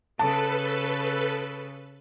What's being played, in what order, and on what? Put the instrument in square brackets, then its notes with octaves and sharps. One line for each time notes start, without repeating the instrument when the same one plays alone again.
[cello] C#3 [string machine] A4 B4 [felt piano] A5